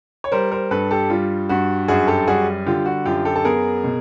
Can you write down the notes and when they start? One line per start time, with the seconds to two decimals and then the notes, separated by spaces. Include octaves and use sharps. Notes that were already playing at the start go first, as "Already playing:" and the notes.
0.24 C#5
0.32 G3 A#4 C5
0.52 A#4 C5
0.71 G2 A4 B4
0.91 G4 A4
1.10 G3 F4
1.49 G2 F#4
1.88 F#2 F#4 G#4
2.08 G4 A4
2.27 G3 F#4 G#4
2.66 D3 F4 G4
2.86 F#4
3.05 F#2 F4 G4
3.25 G4 A4
3.36 A4
3.45 B3 G#4 A#4
3.84 B2